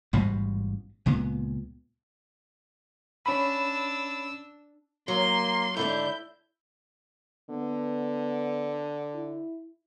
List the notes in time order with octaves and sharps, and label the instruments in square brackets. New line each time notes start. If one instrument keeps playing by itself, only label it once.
[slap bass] A1 G#2 B2 G3
C#2 A#2 G#3 B3
[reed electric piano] C#4 B5 [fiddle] D4 E6
[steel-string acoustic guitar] F#3 [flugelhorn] A#3 [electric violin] C6
[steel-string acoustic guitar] G#2 D3 D4 [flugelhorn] E4 [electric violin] G6
[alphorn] D3 [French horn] B3
[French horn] E4